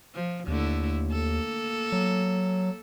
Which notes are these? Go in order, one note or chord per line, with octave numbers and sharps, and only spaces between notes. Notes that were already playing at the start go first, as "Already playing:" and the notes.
F3
D#2 D3 A3 E4
A#3 A4
F#3